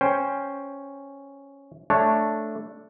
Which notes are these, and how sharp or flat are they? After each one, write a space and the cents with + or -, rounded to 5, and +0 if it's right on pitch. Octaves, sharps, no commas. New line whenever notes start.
C#4 +0 C5 +0 G5 +15
A3 +0 D4 +0 C#5 +0